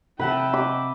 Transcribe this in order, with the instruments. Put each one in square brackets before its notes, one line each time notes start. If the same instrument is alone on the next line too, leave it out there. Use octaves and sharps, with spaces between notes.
[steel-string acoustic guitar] C3 F#5 A5 [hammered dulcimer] B4 [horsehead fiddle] E5 G5
[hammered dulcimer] D6